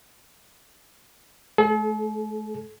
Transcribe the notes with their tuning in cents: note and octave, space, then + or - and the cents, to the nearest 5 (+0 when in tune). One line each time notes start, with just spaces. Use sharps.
A3 -40 A4 -45